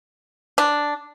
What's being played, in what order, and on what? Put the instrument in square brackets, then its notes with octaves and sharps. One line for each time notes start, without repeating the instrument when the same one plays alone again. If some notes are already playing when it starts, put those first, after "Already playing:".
[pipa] D4